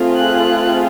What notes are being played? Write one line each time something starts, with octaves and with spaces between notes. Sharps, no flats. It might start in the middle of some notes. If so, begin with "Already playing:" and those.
Already playing: A3 C4 F4 G#4
F#6